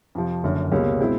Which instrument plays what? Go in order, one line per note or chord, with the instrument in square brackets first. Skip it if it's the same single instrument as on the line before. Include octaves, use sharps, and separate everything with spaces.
[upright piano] F2 C3 F3
F#1 F#2 D3
C#2 B2 G3 A#3 C#4
B2 G#3 C4 E4